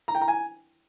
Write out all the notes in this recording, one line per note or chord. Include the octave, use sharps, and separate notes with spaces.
A#5
G5
A#5
G#5